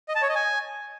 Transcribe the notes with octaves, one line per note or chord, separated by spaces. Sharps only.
D#5
A5
C#5
D#5
G#5